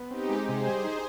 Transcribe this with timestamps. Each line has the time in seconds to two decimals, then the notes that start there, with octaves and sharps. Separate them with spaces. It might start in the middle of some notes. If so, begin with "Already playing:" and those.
Already playing: B3
0.11 C4 D#4 G4
0.29 G#3
0.48 C3 G#4 C5
0.67 G3
0.84 D#4